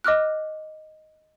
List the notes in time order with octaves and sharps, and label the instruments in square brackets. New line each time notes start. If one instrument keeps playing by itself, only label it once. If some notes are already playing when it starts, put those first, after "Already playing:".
[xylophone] D#5 D6 F6 F#6